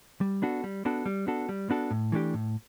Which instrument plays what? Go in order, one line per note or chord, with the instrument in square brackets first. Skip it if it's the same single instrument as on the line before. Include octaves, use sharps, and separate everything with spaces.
[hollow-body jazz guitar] G3
B3 D4 F#4 A4
G3
B3 D4 F#4 A4
G3
B3 D4 F#4 A4
G3
B3 D4 F#4 A4
A2
E3 A3 D4 G4
A2